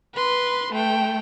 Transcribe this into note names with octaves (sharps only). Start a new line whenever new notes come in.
B4 C6
A3 G5